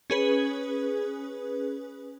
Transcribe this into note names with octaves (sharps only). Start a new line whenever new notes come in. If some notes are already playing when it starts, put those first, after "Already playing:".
C#4 G#4 B4